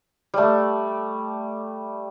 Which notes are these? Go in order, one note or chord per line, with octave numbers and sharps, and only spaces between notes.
G3 A3